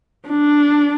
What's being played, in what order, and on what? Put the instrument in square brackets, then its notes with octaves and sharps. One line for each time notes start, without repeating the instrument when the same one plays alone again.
[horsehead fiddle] D4